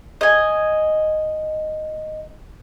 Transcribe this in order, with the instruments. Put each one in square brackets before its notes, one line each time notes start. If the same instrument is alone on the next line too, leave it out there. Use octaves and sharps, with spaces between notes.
[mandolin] D#5 G#5